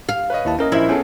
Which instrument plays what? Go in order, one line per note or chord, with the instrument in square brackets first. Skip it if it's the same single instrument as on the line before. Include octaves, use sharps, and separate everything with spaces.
[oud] F5
[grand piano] B4 C#5 D#5
[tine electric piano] D#2 E4 A5
[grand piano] A#3 E4 [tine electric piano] C#4 A#4 D#5
[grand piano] A#1 C5 E5 [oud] E4
[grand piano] B3 G#4 A4 [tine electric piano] C#4